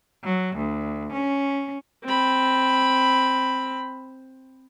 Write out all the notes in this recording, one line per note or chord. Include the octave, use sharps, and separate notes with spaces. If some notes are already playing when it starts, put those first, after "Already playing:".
F#3
D2
C#4
C4 B5